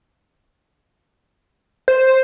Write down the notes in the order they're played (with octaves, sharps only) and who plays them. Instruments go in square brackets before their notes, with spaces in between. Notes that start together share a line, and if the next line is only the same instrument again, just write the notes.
[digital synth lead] C5